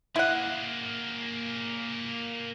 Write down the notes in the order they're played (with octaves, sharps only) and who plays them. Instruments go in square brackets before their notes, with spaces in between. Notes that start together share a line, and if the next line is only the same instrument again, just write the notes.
[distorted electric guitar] A#3 G#4 [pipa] E4 F#5